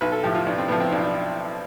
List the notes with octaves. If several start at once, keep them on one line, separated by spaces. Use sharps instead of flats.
B1 B4
A4
A2 F3 G4
F4
B1 D4
C4
A2 F3 B3
C4
B1 D4
D4